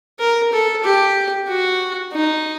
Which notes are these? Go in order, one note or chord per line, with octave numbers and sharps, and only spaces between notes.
A#4
A4
G4
F#4
D#4